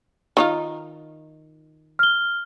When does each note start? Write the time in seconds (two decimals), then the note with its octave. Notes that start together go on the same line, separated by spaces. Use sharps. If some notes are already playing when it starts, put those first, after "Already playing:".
0.37 D#3 D#4 F4
1.99 F6 G7